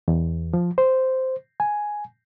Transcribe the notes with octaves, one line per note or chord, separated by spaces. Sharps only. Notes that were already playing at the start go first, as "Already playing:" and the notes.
E2
F3
C5
G#5